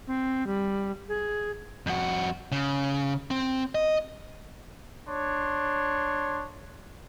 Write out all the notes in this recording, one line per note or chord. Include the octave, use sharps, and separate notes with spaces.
C4
G3
G#4
F2 F#4
C#3
C4
D#5
D4 C#5 C6